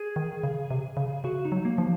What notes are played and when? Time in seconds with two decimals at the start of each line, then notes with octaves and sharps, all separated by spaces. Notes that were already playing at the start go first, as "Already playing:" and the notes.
Already playing: G#4
0.16 D#3
0.43 C#3
0.71 C3
0.97 C#3
1.24 C#3 F#4
1.45 D#4
1.52 F#3
1.65 A#3
1.78 F3